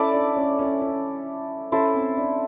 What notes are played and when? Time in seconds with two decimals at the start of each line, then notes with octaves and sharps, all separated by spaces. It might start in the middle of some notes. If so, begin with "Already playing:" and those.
Already playing: C#4 E4 A4 D5
0.14 D4
0.36 C#4
0.59 C#4
0.82 C#4
1.72 C#4 E4 A4 C5
1.94 C4
2.17 D4